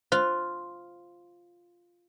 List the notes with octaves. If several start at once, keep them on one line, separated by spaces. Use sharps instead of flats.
F4 C5